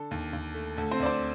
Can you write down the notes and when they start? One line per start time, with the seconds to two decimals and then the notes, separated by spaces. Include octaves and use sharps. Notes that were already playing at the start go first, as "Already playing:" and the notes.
Already playing: D3 A4
0.11 D#2
0.33 D#2
0.54 A3
0.77 D2 A4
0.91 C4 C5
1.00 D2 D5
1.06 C4 C5